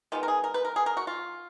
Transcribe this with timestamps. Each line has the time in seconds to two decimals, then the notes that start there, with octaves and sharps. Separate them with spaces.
0.12 D#3 G#3 B3 F4
0.23 A#4
0.28 G#4
0.44 A#4
0.54 B4
0.65 A#4
0.76 G#4
0.86 A#4
0.97 F#4
1.07 F4